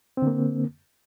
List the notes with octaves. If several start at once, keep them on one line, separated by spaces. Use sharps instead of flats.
D3 A#3 C4